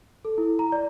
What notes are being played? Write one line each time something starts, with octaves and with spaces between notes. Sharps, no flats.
A4
E4
A#5
D5